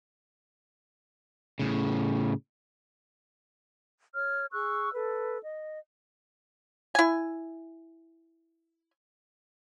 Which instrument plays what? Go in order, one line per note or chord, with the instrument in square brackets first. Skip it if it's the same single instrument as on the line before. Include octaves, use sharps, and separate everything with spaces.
[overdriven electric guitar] A2 C#3
[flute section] C#5 F6
G#4 C#6 E6 F#6
A4 B4
D#5
[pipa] E4 G#5